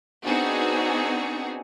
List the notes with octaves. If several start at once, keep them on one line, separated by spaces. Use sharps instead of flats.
B3 C4 D4 D#4 F#4 G#4